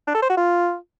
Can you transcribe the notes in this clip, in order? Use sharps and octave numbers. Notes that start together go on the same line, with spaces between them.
D4
A4
C5
F#4
F4